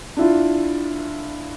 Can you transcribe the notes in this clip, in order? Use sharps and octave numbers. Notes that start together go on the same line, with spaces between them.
D4 E4 F4